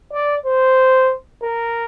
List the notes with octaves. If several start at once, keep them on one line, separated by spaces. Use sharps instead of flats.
D5
C5
A#4